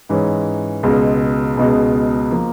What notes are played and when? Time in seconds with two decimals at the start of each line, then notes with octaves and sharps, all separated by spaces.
0.09 G#2 E3 G#3 C#4
0.83 C#2 B2 G#3
1.57 C#2 B2 G#3
2.32 F3 A#3